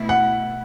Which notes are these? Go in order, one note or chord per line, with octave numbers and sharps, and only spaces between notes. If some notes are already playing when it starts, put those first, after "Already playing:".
Already playing: B2 A3 E4
F#5